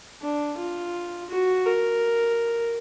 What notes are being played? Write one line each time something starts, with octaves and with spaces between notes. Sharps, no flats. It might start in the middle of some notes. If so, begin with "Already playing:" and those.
D4
F4
F#4
A#4